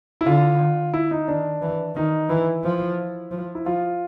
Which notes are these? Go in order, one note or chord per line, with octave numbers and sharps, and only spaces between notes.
E4
D3 F4
E4
D#4
D#3 D4
E3
D#3 D#4
E3 E4
F3
F3
E4
F3 F4